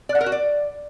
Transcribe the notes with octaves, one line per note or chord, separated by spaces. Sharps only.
D5
F#5
A#4
F#4
D5